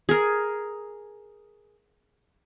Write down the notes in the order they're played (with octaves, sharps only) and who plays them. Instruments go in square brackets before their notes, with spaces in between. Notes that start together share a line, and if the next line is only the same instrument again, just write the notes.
[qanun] G#4 A#4